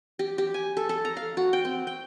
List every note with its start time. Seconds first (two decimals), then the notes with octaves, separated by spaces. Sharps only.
0.19 G4
0.38 G4
0.54 G#5
0.77 A4
0.89 A4
1.05 A#5
1.17 F5
1.37 F#4
1.53 G5
1.65 C4
1.87 G5